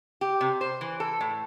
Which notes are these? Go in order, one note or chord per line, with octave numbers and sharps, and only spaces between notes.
G4
C3
C5
E3
A4
A2